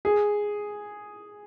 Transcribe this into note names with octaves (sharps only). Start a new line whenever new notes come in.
G#4